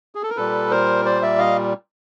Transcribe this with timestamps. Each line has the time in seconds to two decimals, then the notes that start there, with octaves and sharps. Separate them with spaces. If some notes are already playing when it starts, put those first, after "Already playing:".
0.15 G#4
0.23 A4
0.30 A#4
0.36 A#2 G3 A4 B4
0.71 A#4 C5
1.05 C5 D5
1.22 D5 E5
1.39 D#5 F5